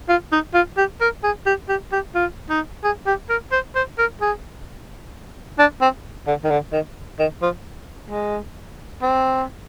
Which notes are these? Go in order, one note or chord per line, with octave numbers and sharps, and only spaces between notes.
F4
D#4
F4
G4
A#4
G#4
G4
G4
G4
F4
D#4
G#4
G4
A#4
C5
C5
A#4
G#4
D4
C4
D3
D#3
D3
D#3
D#3
F3
G#3
C4